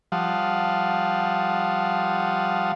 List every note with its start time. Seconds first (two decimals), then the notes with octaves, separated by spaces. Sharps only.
0.12 F3 G3 F5 F#5 A5 D#6